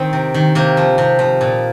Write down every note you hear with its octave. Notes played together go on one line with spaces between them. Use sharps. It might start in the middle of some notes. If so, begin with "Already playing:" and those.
Already playing: D#3 C4
C3
D#3
C3 A#3
F3
C3
F3
A#2